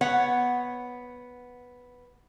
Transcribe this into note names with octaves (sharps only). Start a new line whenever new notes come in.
B3 C#5 F#5